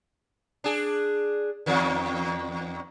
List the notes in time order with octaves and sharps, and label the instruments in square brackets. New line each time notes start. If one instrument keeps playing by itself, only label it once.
[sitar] D4 G#4
E2 D#3